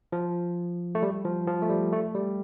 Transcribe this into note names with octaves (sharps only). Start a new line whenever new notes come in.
F3
A3
G3
F3
F3
A3
G3
A3
G3